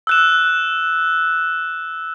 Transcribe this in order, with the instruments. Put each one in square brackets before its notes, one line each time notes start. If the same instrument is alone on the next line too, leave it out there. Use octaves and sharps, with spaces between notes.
[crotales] E6 F#6 E7